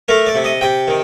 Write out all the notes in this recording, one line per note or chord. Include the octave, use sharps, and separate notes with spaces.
A3 A#4
D5
C3
D#5
C3 G5
D#3